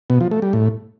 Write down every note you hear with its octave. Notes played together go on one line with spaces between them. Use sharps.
B2
F3
A3
G3
A2